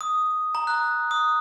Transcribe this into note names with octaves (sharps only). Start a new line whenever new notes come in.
D#6
A#5
F#6
D#6